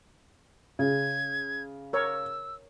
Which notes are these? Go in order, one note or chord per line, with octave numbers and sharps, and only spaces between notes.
C#3 G#6
A#4 C#5 E6